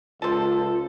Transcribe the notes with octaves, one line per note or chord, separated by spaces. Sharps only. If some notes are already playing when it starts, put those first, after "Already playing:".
C#2 F4 A4 C5 A5